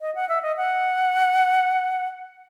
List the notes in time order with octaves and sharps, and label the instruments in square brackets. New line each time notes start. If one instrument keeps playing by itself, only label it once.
[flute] D#5
F#5
E5
D#5
F#5